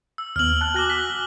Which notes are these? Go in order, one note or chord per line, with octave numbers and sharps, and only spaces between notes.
E6
D#2 B3 F6 F#7
A5 F#6
F#4 G#5 D6 F#6 A#6 G7
B6